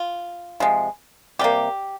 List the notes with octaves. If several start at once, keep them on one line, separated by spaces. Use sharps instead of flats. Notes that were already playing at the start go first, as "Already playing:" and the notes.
Already playing: F4
C3 F3 G#3
C3 G3 A#3 G4